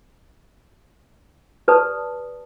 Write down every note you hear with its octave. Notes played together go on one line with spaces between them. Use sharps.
G4 B4 D5 A5 D#6